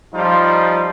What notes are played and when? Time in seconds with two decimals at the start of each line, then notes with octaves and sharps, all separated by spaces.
0.14 F3 G3 D#4 F4